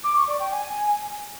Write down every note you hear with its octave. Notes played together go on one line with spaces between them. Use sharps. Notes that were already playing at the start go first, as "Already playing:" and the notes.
D6
C#6
D5
G5
G#5